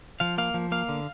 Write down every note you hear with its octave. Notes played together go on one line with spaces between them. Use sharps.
F3 F5
A#3 F5
F3
A#3 F5
D3